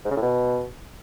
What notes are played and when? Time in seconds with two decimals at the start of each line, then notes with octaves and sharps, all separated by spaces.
0.05 G#2
0.11 C#3
0.17 A2
0.22 B2